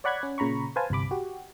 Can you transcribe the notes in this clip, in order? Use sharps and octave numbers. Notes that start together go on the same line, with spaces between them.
C#5 D5 F#5 B5 F#6 G#6
C#4
A#2 C#3 A#5 B5 C#6
B4 C5 F5 G#5 A5
G1 C2 C3 B5 D6
F#4 G4